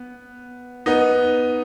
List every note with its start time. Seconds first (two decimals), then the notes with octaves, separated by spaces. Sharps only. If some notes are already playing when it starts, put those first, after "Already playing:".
Already playing: B3
0.86 B3 D#4